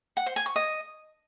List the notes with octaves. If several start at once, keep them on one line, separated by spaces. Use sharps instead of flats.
F#5
C5
G#5
C#6
D#5